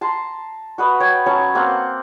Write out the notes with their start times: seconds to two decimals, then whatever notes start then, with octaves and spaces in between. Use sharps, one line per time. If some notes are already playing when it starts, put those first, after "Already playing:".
0.01 A5 A#5 C6
0.78 F#4 B4 D#5
1.00 C#5 G5
1.26 F#3 C#4 C#5 A5
1.55 A#3 C4 F#5